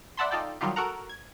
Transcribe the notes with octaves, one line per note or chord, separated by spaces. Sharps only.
D5 E5 F#5 A5 B5 C6
D#4 F4 A4 D5 G5
D#3 F#3 G3 D#4 F4 G4
F#4 A4 A#4 F#5 A#5
G#6